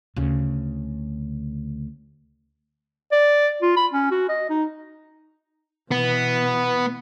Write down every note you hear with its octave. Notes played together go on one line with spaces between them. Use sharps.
D2 C#3
D5
F4
B5
C#4
F#4
D#5
D#4
B2 E3 B3